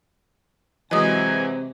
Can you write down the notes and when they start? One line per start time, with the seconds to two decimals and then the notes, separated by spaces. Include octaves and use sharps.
0.91 C3 E3 F#3 G#3 D#5 G#5 D#6